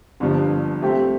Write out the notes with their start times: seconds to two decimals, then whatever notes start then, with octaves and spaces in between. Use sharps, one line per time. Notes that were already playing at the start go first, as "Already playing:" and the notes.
0.20 G1 G2 F3
0.82 C3 A3 C4 G4